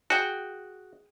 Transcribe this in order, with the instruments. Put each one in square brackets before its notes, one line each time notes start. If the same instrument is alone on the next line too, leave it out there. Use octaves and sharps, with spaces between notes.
[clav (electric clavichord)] F#4 [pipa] G#4 G5